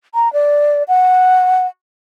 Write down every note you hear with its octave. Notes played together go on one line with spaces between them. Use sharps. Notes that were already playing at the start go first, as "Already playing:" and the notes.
A#5
D5
F#5